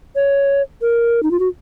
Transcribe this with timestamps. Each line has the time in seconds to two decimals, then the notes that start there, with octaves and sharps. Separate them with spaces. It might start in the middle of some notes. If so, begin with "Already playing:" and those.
0.16 C#5
0.82 A#4
1.23 D#4
1.31 F4
1.40 F#4